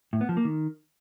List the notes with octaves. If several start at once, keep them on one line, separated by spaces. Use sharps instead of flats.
A2
B3
F3
A#3
D#3